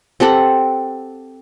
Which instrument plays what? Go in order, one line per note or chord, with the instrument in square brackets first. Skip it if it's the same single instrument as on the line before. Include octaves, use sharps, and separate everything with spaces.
[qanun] C4 G4 A4 F#5